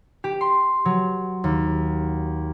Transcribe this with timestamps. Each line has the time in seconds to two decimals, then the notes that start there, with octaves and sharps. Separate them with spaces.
0.24 G4
0.41 C6
0.85 F#3
1.44 D#2